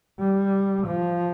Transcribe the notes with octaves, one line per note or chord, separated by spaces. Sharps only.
G3
F3